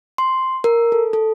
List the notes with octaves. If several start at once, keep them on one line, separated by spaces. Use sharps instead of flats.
C6
A#4
A4
A4